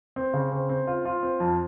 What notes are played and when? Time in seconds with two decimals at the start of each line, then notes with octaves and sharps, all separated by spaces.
0.16 C4
0.34 C#3
0.52 C4
0.69 C4
0.87 F4
1.05 F4
1.23 C4
1.40 F2